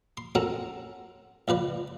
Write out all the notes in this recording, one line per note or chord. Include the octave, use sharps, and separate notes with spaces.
C6
C4 C#4 F#4 A4 A#4
C#2 F3 B4 D5